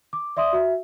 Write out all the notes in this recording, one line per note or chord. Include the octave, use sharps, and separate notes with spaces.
D6
D5 E5 C6 D#6
F#4 E5